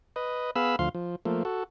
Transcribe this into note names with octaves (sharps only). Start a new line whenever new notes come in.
B4 D#5
B3 G#4 F5 B5 E6
D2 F3 F5 C6
F3
F3 A3 A#3
F#4 A4